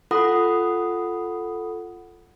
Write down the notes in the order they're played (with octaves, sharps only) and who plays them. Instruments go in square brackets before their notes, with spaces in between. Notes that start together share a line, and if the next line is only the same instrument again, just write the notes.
[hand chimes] F4 A4 F#5 B5 D#6